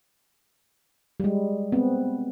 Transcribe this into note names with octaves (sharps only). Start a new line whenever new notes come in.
G3 G#3
B3 C4